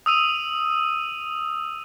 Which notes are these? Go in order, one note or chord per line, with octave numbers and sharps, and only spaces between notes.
D#6 E6 D#7 F7